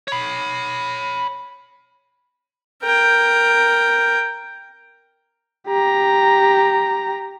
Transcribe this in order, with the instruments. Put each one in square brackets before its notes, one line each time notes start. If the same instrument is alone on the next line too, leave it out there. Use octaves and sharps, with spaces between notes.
[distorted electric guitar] C#5 B5
[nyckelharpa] A#4 G5
[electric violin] G4 A#5